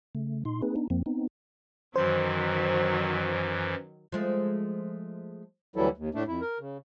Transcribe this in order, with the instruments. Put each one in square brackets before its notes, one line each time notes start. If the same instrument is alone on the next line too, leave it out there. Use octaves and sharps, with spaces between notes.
[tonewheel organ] C#3 A3
A#2 D#4 C6
A#3 C4 D#4 G#4 B4
B3 D4 D#4
F2 F3 A#3 C4
B3 C4 D#4
[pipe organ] F#2 E3 [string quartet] D#3 F#3 [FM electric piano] C5
[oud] F3 G#3 A3
[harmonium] D2 E3 F#3 G3 E4 A4
D#2
A2 A3 D4
F2 E4
A#4
C#3